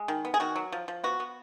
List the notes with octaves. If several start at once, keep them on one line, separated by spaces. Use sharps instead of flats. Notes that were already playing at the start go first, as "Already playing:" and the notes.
Already playing: G#3
D#3
B3
G#4
D#3 F#4
F#3
F3
F3
B3 F#4
B3